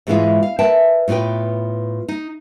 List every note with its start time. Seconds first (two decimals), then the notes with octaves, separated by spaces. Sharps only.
0.07 G#2 B2 E3 G#3 E4 F4
0.43 F5
0.59 A#4 B4 E5 G5 A5
1.08 A2 B3 F4 B4 G5
2.08 D#4